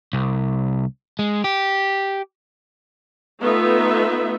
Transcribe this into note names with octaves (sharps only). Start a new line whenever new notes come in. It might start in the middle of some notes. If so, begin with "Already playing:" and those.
C2
G#3
G4
A3 B3 D#4 F4 E5